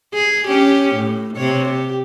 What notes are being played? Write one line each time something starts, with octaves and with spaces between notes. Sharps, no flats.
G#4
C#4 G4
A2
C3 C#5
G4